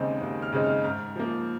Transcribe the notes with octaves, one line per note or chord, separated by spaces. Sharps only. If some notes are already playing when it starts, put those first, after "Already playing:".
Already playing: D#2 C#3 G#3 C4 D#4
D#2
F6
C#3 G#3 C4 D#4
F6
G#2 F6
F3 A#3